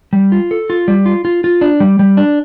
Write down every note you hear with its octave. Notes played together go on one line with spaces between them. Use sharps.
G3
F4
A4
F4
G3
F4
F4
F4
D4
G3
G3
D4